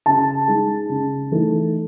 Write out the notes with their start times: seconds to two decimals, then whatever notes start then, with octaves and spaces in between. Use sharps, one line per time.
0.06 C#3 A5
0.48 G#3 D#4
0.89 C#3
1.31 E3 A3 D#4